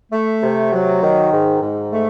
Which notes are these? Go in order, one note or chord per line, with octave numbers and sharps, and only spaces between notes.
A3
C3
F#3
D#3
G#2
G#2
A3